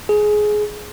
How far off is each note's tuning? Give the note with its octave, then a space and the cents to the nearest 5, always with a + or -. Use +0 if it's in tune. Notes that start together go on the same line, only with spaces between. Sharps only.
G#4 +15